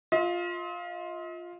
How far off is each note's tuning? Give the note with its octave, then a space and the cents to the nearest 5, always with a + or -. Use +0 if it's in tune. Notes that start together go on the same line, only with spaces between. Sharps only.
F4 +5 D#5 +45